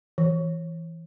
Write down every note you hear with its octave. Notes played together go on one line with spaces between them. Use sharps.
E3